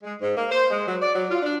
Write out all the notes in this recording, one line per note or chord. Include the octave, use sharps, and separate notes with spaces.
G#3
G#2
A#3
C5
G#3
F#3
D5
F#3
F4
D4